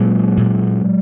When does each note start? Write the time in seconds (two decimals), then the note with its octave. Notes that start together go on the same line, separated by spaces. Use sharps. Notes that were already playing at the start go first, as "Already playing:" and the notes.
Already playing: A#2 F#3 G#3
0.37 A#2